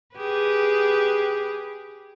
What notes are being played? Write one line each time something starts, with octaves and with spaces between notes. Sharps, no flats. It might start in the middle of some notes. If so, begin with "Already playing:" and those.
G4 G#4 B4